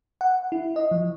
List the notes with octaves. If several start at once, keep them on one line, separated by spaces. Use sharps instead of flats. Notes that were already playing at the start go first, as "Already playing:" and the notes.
F#5
E4
D#5
F3